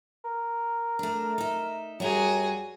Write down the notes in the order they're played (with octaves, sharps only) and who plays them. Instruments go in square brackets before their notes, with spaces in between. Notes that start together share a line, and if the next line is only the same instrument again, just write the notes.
[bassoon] A#4
[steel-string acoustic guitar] A3 D4
D#4 E5
[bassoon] F#2 [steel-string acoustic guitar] G3 A#5 [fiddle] F#4 G#4